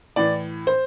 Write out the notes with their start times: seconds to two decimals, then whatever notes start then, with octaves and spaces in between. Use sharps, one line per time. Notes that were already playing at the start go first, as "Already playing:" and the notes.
0.16 A2 E3 D5
0.67 C5